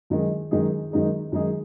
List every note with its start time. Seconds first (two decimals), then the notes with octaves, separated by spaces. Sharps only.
0.10 F#2 D#3 G#3 D#4 G#4
0.51 F#2 D#3 G#3 D#4 G#4
0.91 F#2 D#3 G#3 D#4 G#4
1.32 F#2 D#3 G#3 D#4 G#4